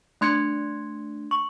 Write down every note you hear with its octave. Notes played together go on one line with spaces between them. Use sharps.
A3 D4 C6 F#6 G#6 C#7
C#6